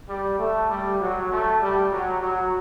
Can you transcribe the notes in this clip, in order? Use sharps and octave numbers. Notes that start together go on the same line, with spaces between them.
G3
A3
G3
F#3
A3
G3
F#3
F#3